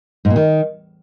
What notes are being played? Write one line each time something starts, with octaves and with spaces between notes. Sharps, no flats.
G#2
A#2
D#3